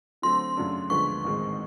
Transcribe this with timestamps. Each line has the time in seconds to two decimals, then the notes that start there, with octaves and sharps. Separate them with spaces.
0.22 D3 F#3 A3 C4 C6
0.57 F#2 C#3 F#3 A3 D4
0.90 D2 D3 F3 G#3 B3 C#6
1.24 A1 G#2 D#3 G#3 C4